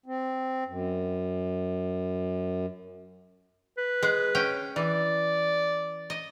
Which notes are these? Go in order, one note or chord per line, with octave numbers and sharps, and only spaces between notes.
C4
F#2
B4
G#3
C#4 G5
E3 D5
D#5